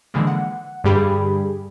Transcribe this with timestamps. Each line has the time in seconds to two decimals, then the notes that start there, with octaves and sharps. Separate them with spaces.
0.14 D3 E3 F3 G#3 A#3
0.27 F#5
0.84 G2 D3 G3 G4 G#4 B5